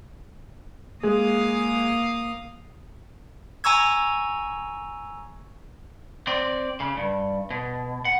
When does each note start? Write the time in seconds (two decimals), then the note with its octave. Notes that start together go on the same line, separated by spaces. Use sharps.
1.03 G#3 A#3 G#4 F5 D#6
3.64 G#5 A#5 C#6 E6 G#6
6.27 C4 D5
6.80 C#3
6.97 G2
7.50 B2
8.05 F#5